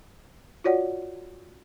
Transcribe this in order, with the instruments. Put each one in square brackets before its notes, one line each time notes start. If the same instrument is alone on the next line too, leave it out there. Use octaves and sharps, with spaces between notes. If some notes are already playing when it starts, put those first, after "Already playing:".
[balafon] F4 F#4 C#5 D5 F#5